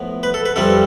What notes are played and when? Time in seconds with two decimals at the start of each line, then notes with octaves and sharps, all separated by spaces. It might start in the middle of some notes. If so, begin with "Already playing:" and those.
Already playing: A2 F3 B3
0.23 B4
0.34 A4
0.45 B4
0.56 F2 C3 G3 C4 A4